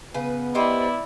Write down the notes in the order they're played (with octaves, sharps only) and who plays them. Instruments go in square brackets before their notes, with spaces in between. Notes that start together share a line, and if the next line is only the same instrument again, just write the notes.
[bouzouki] C#3 B4 [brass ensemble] B3
[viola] E4 D5 [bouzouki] G4 C5 D#5